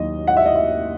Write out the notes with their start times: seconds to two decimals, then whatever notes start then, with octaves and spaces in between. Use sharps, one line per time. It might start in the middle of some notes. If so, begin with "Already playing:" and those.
Already playing: D#2 D#3 F#3 D#5
0.27 F#5
0.37 E5
0.46 D#5
0.56 E5